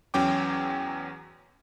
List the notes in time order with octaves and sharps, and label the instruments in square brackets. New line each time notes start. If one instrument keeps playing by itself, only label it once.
[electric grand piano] E2 F#3 C#4 G5 D6